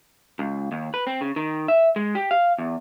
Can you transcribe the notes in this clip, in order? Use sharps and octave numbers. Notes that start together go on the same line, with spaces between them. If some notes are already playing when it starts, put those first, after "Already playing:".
C#2
D#2
B4
C4
C#3
D#3
E5
G#3
G4
F5
E2